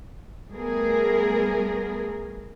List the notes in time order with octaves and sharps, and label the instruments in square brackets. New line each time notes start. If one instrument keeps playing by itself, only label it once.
[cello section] G3 A3 B3 G#4 A#4